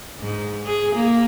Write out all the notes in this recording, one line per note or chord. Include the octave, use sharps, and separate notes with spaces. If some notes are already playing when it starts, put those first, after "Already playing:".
G#2
G#4
A#3